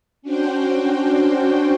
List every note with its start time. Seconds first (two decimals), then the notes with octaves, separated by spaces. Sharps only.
0.22 C#4 D4 F#4 C5 G5